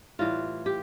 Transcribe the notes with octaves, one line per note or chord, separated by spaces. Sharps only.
A2 E3 G3 F4
G4